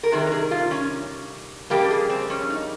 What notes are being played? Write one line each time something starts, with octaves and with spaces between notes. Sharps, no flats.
A#4
C3 D#3 G3 G#4
A#4
G#4
F4
C#4
F2 C#3 G3 A#3 G4
G#4
C4
C#4
D#4